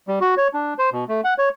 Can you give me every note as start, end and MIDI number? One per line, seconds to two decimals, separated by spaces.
0.08 0.19 55
0.21 0.35 66
0.38 0.48 73
0.54 0.74 62
0.79 0.90 72
0.92 1.04 47
1.09 1.21 57
1.24 1.34 78
1.38 1.49 73